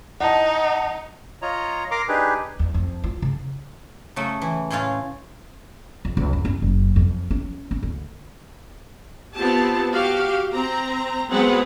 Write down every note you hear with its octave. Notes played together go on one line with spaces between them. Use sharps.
D#4 F#5 A5
F4 C#5 D#5 A#5
A#4 A#5 C6 D6
D4 D#4 G4 G#4 B4
E2
F2
F4
C#3
C#3 F#3 A3
E3
A2 G#3 C#4 F4 F5
F2
C#2
F#2
C#4
F#1
F2
C#4
C#4
D2
B3 C4 F4 G4 A5
F#4 G4 F5
C4 A#5
F#3 G#3 B3 C4 B4 F#5